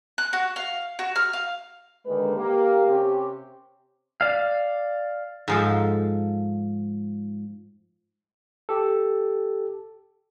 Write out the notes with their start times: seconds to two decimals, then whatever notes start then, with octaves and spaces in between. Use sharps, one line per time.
0.18 F#6
0.33 F#4
0.56 F5
0.99 F#4
1.16 F6
1.33 F5
2.05 D3 D#3 G3 G#3 A#3 B4
2.35 A#3 G4
2.87 C3 C4 C#4 G4
4.21 D5 F5
5.48 G#2 F3 A4
8.69 G4 A4